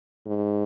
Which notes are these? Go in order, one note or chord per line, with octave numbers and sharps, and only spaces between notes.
G#2